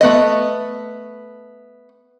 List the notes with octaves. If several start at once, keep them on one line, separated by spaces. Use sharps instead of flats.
A3 B3 D#5